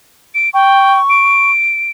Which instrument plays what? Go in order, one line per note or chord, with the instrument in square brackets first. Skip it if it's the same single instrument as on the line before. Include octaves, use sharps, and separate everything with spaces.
[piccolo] D7
[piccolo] G5 [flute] C#6
[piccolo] D7